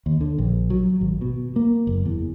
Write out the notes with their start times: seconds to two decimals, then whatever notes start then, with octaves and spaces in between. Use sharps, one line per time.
0.06 D#2
0.21 D3
0.38 A#1
0.70 F#3
1.01 G#1
1.21 B2
1.56 A#3
1.87 F#1
2.06 E2